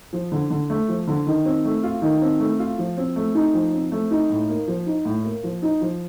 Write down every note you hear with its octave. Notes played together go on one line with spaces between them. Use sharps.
F3
D3
D3
A3
F3
D3
D#3
C4
A3
F4
D#3
C4
A3
F4
F3
C4
A3
D#4
F3
C4
A3
D#4
A2
A#3
F3
D#4
A2
A#3
F3
D#4
F3